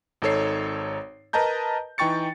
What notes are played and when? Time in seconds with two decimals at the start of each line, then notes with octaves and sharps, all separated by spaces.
0.22 G#1 D#4 A4 C#5 C7
1.33 A#4 B4 D#5 A5 A#5 G6
1.98 E3 D#4 G5 C#6 A6 C#7